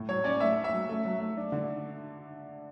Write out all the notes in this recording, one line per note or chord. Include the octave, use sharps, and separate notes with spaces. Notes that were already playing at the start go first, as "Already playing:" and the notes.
Already playing: A2
F#3 C#5
C#4 D5
A3 E5
C#4
E5
F#3
A3
F#3
A3
D4
D3